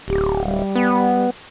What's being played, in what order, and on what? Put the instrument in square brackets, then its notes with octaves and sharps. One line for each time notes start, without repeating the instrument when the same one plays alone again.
[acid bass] D1 [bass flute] G4
[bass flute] G3
[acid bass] B3